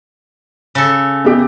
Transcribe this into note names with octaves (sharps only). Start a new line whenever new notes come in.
C#3 A4
B3 G4